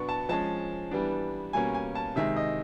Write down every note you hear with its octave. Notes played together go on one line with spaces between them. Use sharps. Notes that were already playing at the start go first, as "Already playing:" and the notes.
Already playing: B2 F#3 B3 D4 C#6
A5
F3 G#3 C#4 A5
E3 G3 B3 D4
B2 G3 A#3 C#4 G#5
G#5
A5
C3 D#3 G#3 E5
D#5